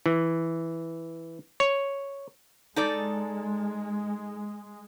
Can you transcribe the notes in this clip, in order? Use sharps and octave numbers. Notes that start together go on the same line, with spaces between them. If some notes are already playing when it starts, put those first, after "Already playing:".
E3
C#5
G#3 D#4 A4 D5